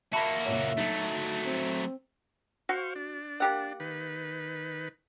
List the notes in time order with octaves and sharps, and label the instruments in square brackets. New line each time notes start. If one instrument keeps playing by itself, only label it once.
[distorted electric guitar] A#3 F#4 [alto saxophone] E5 [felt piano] A5 B5 A#6
[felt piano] F#1 A#2 C#5
[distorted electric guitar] F#3 A3 [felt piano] D#4
[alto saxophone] C4
[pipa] F#4 [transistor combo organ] C5 F5 C#6
[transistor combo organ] D4
[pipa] A#3 G4 F#5
[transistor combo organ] D#3 B4